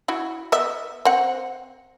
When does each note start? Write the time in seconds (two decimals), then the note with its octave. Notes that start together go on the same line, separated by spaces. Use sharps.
0.08 E4 F#4
0.52 B3 D#5 E5
1.05 C4 F#5